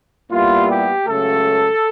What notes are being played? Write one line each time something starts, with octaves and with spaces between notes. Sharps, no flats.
A#2 G3 B3 E4 F4
G4
C#2 C#3 F#3 A3 A4